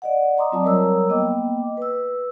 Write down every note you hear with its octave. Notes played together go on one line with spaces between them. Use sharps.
D5 D#5 F#5
D#5 A#5 C6 D6 D#6
F#3 C4 F4 D5 A5 D#6
F#3 G3 A#4 C#5 A#5 E6
A#3 B3 D#5 G5 D6
B4 E6